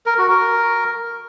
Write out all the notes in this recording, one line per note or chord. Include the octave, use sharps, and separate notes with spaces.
A#4
F#4
A#4